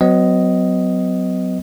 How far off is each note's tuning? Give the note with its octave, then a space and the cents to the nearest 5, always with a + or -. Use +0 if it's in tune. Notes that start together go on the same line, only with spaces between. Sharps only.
F#3 +5 B3 +45 D#5 +0